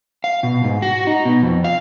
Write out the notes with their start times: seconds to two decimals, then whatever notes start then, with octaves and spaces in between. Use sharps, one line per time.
0.24 F5
0.43 B2
0.64 G#2
0.82 F#4
1.07 D#4
1.25 B2
1.43 F2
1.64 F5